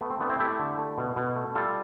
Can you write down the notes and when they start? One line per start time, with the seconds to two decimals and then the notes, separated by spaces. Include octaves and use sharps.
0.01 A3 B3
0.10 C4
0.20 A3 B3 D4
0.29 C4 E4
0.39 A3 E4 G4
0.59 D3
0.78 A3
0.98 B2
1.16 B2
1.36 A3
1.55 G3 F4 A4